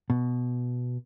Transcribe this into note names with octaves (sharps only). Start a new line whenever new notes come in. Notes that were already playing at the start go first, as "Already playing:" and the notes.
B2